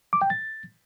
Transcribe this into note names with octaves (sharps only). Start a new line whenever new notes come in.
D6
G5
A6